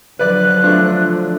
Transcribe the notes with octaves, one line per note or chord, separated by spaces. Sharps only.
D3 F3 F#3 B4 D5 F#6
A3 D4 F4